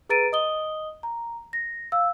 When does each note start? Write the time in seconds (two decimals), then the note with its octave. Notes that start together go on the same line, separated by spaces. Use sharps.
0.09 G#4 B4 A#5 A6 D7 D#7
0.32 D#5 D#6 G7
1.03 A#5
1.53 A#6
1.92 F5 E6